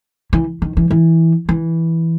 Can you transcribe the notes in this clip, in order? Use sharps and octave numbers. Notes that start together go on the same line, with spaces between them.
E3
D#3
E3
E3
E3